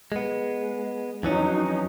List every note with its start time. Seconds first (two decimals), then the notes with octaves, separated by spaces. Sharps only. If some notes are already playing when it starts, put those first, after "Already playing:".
0.12 G#3 B3
1.23 F2 E3 F#3 C#4 D#4